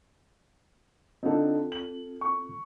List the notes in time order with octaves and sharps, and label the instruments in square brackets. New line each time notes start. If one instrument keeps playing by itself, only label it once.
[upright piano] D3 D#4 [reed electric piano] C4 F4 A4
[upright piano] F#7
C#6